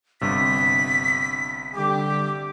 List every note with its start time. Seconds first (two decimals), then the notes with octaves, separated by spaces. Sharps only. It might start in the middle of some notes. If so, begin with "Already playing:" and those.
0.21 G1 G2 C3 B6
1.75 D3 G3 G4 D6